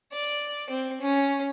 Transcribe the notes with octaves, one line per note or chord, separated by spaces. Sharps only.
D5
C4
C#4